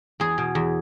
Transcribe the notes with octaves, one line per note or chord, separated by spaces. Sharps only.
E2 G#4
B2
E2